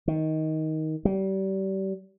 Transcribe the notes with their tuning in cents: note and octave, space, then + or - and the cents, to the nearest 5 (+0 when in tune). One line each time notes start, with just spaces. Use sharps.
D#3 +15
G3 -30